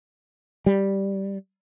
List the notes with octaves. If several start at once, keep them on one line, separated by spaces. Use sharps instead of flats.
G3